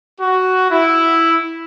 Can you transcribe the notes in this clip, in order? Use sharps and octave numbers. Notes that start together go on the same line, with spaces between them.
F#4
E4